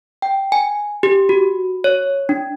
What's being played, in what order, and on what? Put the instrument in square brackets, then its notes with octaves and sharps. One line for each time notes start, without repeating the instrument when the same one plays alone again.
[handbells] G5
G#5
G4
F#4
C#5
D4